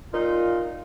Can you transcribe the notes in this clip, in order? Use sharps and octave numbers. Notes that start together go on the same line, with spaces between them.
A#2 D#4 F4